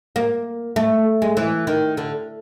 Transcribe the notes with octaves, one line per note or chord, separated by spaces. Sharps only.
A#3
A3
G#3
E3
D#3
D3